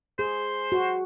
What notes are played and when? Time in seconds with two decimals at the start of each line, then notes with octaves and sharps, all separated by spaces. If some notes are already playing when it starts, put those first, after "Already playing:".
0.19 G#4 C5
0.72 F#4